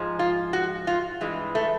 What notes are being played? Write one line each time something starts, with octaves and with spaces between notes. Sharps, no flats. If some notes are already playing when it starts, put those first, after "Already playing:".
Already playing: G#2 F3 G#3
F4
F#4
F4
G2 E3 G#3
A3